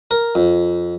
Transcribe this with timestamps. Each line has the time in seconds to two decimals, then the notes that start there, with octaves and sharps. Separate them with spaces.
0.11 A#4
0.35 F2